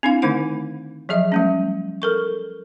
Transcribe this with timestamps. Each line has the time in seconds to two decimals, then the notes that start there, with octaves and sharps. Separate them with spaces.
0.03 C4 D4 E4 F5
0.22 D3 D#3 A3 D#4 C5 F#5
1.09 F3 F#3 G#4 D#5 E5
1.32 G3 A3 C#4
2.02 A4 A#4 C#6